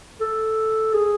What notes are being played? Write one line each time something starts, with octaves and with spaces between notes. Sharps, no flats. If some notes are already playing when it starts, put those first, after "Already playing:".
A4
G#4